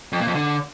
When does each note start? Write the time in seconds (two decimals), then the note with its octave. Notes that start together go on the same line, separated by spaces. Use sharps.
0.12 F2
0.20 A#2
0.27 F2
0.35 D3